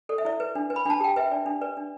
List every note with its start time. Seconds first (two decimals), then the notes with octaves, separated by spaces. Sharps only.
0.09 A4 D5
0.18 E5
0.25 E4 D5
0.40 B4
0.55 D4
0.70 B4
0.76 B5
0.85 D4 A5
1.00 G4 G5
1.16 B4 E5
1.32 D4 D5
1.46 D4
1.61 B4 D5
1.77 D4